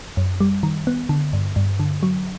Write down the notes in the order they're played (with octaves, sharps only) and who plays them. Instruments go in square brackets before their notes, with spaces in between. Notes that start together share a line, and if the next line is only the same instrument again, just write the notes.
[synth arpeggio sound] F#2
G3
D#3
B3
D3
G2
G2
D3
F#3